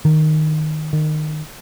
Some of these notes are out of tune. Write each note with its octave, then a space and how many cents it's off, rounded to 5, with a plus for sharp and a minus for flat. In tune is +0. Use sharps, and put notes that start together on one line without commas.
D#3 -5
D#3 -20